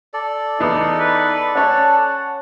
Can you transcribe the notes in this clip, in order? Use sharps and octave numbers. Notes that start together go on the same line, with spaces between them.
A4 D5
E2 B3 D#4
B4
C#4 C#5 F#5 A5